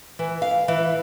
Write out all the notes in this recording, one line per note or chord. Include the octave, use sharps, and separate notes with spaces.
E3
F5
E3